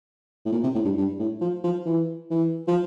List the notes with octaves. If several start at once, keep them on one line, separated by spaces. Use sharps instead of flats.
A2
A#2
C3
A2
G2
G2
A2
F3
F3
E3
E3
F3